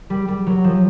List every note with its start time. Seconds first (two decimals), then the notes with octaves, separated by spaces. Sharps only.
0.10 G3
0.28 G3
0.47 F#3
0.64 F3